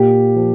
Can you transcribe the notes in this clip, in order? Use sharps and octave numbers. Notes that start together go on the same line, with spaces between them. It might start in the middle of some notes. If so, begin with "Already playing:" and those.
Already playing: A#2 G4
F3